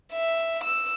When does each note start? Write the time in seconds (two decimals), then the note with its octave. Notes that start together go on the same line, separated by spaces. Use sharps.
0.13 E5
0.64 E6